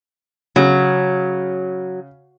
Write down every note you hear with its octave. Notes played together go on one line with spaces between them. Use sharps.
C#3 F#3